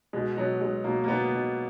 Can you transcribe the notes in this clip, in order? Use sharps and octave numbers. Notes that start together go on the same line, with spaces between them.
B2 G#3
B2 F#3
B2 G#3
B2 A#3
A#3
B2 B3
B2